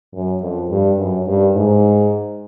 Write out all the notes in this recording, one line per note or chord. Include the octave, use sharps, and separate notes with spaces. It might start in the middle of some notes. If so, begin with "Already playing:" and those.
F#2
F2
G2
F#2
G2
G#2